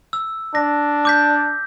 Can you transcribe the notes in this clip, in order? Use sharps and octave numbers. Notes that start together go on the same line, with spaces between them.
E6
D4 A#6
D6 G6 B6